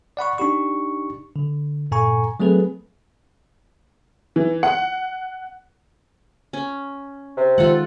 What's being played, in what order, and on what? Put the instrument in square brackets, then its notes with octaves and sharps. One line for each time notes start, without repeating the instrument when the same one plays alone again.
[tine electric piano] D5 F#5 B5 C#6
D4 D#4 G4 C#6
D3
G2 A#2 A4 G#5 A#5 C#6
F#3 A3 C4 G#4 A4 B4
[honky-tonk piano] E3
F#5
[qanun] C#4
[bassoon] C3
[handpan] D#3 G#3 [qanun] F4 A4 F#5